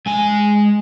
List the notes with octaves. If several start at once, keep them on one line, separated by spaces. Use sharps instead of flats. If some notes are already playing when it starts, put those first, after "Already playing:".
G#3 G#5